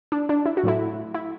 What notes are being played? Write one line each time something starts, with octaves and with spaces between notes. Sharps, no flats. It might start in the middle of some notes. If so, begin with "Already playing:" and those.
D4
D4
E4
F#4
A2 F#3 A3 E4
E4